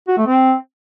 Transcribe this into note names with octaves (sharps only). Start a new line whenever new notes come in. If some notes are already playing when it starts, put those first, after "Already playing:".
F#4
A3
C4